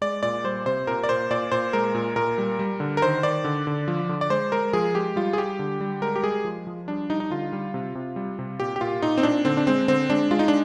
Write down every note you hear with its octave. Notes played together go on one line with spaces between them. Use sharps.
G#3 D5
A#2 D5
G3 C5
C3 C5
A#2 A#4
D5
A#2 C5
A#2 D5
A#2 C5
G#3 A#4
A#2
A#2 A#4
G3
G3
D3
A#4
D#3 C5
D#3 D5
D3
D3
F3
D3
D5
G#3 C5
G#3 A#4
F3 G#4
G#3 G4
G3 F4
G#4
G3 G4
D3
G3
G#3 A#4
G4
G#3 G#4
F3
F3
G3 D4
G3 D#4
D#4
D3 F4
G3
C3
C3
G3
C3
A#2 G4
G4
A#2 F4
A#2 D#4
C4
A#2 D4
D3 C4
D4
G#3 C4
D3 C4
G#3 D4
G#3 F4
D#4
D4